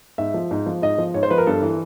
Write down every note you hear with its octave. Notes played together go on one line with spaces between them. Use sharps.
G#2 E5
F3
G#2
F3
G#2 D#5
F3
G#2 C#5
C5
F3 B4
A#4
G2 A4
E3